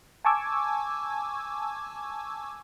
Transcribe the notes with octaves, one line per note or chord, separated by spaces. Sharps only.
G#5 A5 C#6 D6 E6 G#6